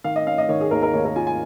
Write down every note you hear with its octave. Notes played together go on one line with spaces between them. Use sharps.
D#3 F5
D#5
C#4 F5
D#5
D#3 C#5
G#4
D#2 A#4
A#4
D#2 C#5
A#4
F4 G#5
G#5